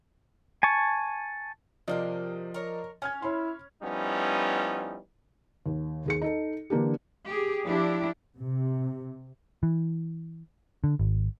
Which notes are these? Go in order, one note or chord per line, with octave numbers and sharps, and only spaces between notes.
G#5 A5 C#6
C3 F3 A#3 G4 D5 D#5
A#4 C#5
C#4 G#5 F6 G#6
E4 C#5 B5 C6
F3 G3 B3 C#4 D#4 E4
D#2
D#2 G#4 C#7
D#4 A4
D3 E3 A#3 D4 G4
G4 G#4
F3 D4 E4 G4
C3
E3
D3
G#1